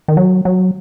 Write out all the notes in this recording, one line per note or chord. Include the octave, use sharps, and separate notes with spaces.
D#3
F#3
F#3